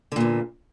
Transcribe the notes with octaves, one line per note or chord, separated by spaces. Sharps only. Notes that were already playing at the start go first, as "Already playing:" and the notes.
E2 A#2 D3